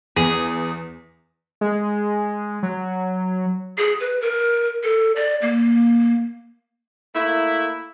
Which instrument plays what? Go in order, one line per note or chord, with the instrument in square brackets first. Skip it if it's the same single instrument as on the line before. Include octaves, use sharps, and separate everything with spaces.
[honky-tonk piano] E2 [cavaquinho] G#4
[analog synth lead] G#3
F#3
[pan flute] G#4
B4
A#4
A4
D5
A#3
[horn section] A3 A#3 E4